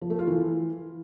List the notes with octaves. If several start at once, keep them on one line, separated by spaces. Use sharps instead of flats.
F3
A3
F4
E3